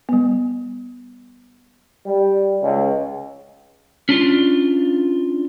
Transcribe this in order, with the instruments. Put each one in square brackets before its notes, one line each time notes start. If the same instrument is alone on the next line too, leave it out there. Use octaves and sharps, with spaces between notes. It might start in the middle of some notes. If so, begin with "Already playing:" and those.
[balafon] G3 B3
[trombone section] G3
C#2
[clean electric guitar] C#4 D4 F4